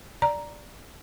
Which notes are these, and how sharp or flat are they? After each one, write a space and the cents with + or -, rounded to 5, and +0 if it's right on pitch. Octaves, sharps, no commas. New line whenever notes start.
D5 +0 A#5 +0